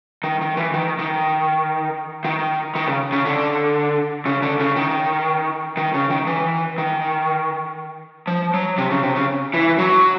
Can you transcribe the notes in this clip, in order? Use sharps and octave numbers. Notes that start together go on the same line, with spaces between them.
D#3
D#3
E3
D#3
D#3
D#3
D#3
C#3
C#3
D3
C#3
D3
C#3
D#3
D#3
C#3
D#3
E3
D#3
F3
F#3
C3
C#3
C3
C#3
E3
F#3